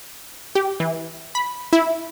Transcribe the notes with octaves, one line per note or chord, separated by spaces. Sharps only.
G4
E3
B5
E4